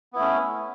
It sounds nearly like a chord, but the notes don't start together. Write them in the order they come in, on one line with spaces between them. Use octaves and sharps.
B3 E4 A3 C#4